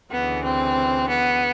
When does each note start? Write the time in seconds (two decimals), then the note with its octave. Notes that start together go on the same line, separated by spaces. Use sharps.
0.12 D2 C#3 E3 B3
0.44 C4
1.08 B3